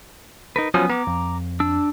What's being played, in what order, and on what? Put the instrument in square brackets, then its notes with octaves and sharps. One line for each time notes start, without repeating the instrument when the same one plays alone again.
[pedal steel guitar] D#4 A#4 B4
[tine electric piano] F3 F#3 C#4 [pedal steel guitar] B3 G#5 D#6
[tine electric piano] B3 [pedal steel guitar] A#5 D6
[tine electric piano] F2
[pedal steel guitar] D4 E6